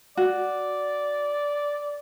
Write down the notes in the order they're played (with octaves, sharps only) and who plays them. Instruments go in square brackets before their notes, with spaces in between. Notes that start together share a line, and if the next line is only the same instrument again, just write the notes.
[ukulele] F#4 [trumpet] D5